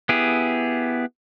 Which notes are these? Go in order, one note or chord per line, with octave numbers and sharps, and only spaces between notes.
B3 E4 G4 G#4